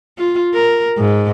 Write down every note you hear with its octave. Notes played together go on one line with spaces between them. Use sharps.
F4
A#4
G#2